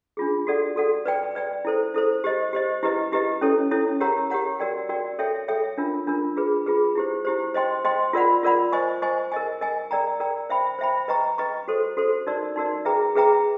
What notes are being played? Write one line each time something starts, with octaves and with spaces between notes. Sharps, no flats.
D4 F4 G#4
F#4 A4 D5 F#5
F#4 A4 D5 F#5
B4 D5 G5
B4 D5 G5
E4 A4 C5
E4 A4 C5
G4 C5 D#5
G4 C5 D#5
E4 G4 B4 D#5
E4 G4 B4 D#5
C#4 E4 A4 C#5
C#4 E4 A4 C#5
G4 A#4 C#5 F#5 A#5
G4 A#4 C#5 F#5 A#5
F#4 A#4 D5 G5
F#4 A#4 D5 G5
A4 C#5 E5 G5
A4 C#5 E5 G5
D4 F4 A#4
D4 F4 A#4
F4 G#4 B4
F4 G#4 B4
E4 G4 C5
E4 G4 C5
C5 D#5 G5 C6
C5 D#5 G5 C6
F4 A#4 D5 F#5 B5
F4 A#4 D5 F#5 B5
C5 D#5 G#5 C#6
C5 D#5 G#5 C#6
A#4 D#5 G#5
A#4 D#5 G#5
A#4 D5 G5 A#5
A#4 D5 G5 A#5
C5 E5 G5 B5
C5 E5 G5 B5
B4 D#5 G5 A#5 C#6
B4 D#5 G5 A#5 C#6
F#4 A4 C5
F#4 A4 C5
D#4 F#4 A#4 D5
D#4 F#4 A#4 D5
G#4 B4 E5 G5 A#5
G#4 B4 E5 G5 A#5